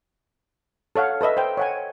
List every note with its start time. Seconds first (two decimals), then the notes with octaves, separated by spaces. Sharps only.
0.96 A4 C#5 F5 F#5
1.21 A4 B4 D#5 E5
1.37 C5 G5
1.57 C#5 F#5 G#5